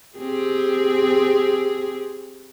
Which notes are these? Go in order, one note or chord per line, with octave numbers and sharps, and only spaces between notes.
C4 G4 G#4